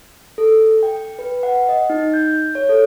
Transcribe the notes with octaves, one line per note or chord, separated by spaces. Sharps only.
A4
G5
B4
F#5
D#5
D#4
G6
C#5
A4